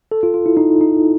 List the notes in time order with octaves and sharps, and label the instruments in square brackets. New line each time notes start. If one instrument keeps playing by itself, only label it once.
[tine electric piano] A4
F4
F4
E4
D#4
D#4